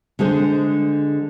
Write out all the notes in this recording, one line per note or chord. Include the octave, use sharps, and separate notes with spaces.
D3 G#3 G#4 C5